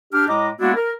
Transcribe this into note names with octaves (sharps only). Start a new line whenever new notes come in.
D4 G4 F6
A2 G#3 D#5 A#5 D6
G#3 A#3 B3 D4 E4 F#4
A#4